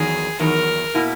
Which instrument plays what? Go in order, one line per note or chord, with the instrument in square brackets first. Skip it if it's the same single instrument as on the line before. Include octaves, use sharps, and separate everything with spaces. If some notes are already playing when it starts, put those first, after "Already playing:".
Already playing: [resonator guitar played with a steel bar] E2 D#3 F#3 [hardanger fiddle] G#4
[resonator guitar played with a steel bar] E2 D#3 F#3 [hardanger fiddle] A#4
[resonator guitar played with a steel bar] B2 A#3 E4